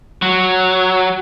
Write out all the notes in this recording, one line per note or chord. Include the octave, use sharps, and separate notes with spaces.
F#3